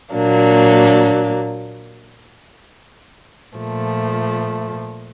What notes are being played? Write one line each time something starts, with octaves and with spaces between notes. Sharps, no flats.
A#2 F#3 A#3 D4
A#2 F3 A3